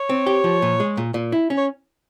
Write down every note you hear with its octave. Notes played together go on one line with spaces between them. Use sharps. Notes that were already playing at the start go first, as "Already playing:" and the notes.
Already playing: C#5
C4
G4
F3
A#2
G#3
A#2
A#2
E4
C#4
C#5